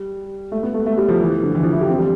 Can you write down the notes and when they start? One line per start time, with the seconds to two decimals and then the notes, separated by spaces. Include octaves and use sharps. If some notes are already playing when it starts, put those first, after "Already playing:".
Already playing: G3
0.52 A3
0.63 B3
0.74 A3
0.86 A3
0.97 G3
1.08 F3
1.20 E3
1.43 D3
1.55 E3
1.63 F3
1.72 E4
1.81 G4
1.89 C4
1.98 G3